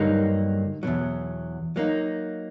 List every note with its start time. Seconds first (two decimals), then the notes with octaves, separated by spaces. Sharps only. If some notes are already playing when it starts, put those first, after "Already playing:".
Already playing: G2 D3 F#3 A#3 D#4
0.83 E2 B2 F#3
1.76 F#3 A#3 D#4